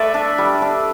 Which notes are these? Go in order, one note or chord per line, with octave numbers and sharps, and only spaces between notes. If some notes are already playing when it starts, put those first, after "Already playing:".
Already playing: A3 A4 B4 D5 E5
D4
G3
D4